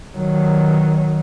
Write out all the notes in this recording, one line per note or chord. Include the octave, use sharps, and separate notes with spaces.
D#3 F#3